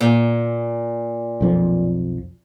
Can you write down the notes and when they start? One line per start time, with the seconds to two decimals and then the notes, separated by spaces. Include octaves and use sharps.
0.01 A#2
1.41 B1 F2 F3